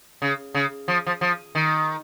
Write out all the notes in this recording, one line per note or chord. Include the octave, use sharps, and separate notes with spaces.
C#3
C#3
F3
F3
F3
D#3